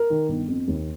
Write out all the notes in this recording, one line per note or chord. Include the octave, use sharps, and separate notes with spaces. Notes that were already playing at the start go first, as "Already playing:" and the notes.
Already playing: A#4
D#3
G1
F2
D#2